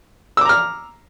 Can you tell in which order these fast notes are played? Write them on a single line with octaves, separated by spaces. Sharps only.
E6 D6 A#5 F6